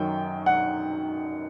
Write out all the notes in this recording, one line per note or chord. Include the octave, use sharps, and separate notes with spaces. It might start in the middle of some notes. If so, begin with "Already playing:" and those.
Already playing: F#2 D#3 F#3 G5
F#5